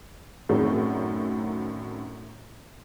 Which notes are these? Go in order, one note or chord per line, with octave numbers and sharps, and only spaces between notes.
F#2 A2 D#3 F#3 C4 D4